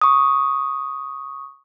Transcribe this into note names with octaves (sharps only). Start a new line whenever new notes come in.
C#6 D#6